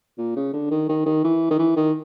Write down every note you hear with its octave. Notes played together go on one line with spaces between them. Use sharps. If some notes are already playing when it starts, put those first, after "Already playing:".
A#2
C#3
D3
D#3
D#3
D#3
E3
D#3
E3
D#3